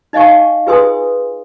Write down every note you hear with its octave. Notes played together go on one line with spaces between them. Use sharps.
D#4 D#5 F5 G#5 C#6
F4 G#4 B4 G#5 C6 D#6